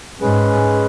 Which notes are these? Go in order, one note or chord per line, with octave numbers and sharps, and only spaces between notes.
G#2 G#3 C#4 G#4 B4